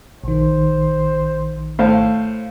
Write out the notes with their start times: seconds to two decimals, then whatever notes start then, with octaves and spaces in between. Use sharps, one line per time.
0.24 A#1 D#3 C5
1.79 A2 C5 F5